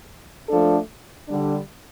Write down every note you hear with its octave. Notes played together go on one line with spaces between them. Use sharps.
F3 A3 D4 A4
D3 G3 D4